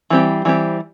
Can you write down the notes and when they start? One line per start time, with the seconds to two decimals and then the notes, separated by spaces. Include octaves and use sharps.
0.10 E3 G3 C4 G4
0.45 E3 G3 C4 G4